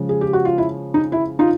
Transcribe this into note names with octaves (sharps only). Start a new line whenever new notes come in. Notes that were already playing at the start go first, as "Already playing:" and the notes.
Already playing: C#3 F3 G#3 C#4
G#4
G4
F#4
F4
E4
D#4
E4
D#4 F4